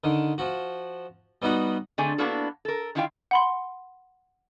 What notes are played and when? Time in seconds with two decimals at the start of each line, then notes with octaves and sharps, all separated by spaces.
0.04 D3 D#3
0.38 F3 F#4
1.42 G3 B3 D#4 F#4
1.98 D3 A3 C4 G#4 D5 G#5
2.18 A#3 B3 D4 E4 F#4 A4
2.65 A4 A#4
2.95 D#3 D4 E4 F4 F5 G5
3.31 F#5 B5 C6